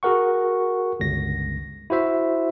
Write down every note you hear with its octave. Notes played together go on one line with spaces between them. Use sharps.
F#4 G#4 A#4 F#5 C#6
G1 C#2 A#6
E4 F#4 C5 E5